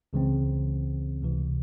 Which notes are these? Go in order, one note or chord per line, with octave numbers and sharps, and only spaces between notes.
C#2 C#3 E3 G#3 C4
C#2 C3 E3